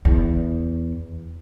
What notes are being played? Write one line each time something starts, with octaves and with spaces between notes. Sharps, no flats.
E2